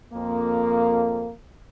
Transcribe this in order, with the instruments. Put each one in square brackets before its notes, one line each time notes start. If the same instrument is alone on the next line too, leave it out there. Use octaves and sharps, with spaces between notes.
[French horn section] F2 A#3